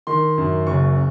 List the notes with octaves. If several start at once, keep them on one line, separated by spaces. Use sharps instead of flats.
D#3 C6
F#2
F#1 C#6